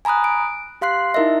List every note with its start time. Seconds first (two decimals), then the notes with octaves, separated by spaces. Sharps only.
0.05 G#5 A#5 B5 D#6 F#6
0.24 D7
0.81 G4 F5 C6 F#6 C7
1.14 D#4 E4 A#4 D#5 E5